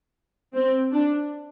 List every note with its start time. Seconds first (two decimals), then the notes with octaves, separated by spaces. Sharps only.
0.54 C4
0.91 D4